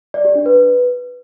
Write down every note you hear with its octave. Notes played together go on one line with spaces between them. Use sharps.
D5
G4
D4
B4